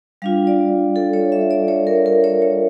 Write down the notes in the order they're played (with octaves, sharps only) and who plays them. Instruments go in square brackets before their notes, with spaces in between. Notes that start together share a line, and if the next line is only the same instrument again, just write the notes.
[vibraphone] G3 D4 F4 F5
D5
A4
C#5
E5
D5
C#5
A#4
A#4
C#5
C#5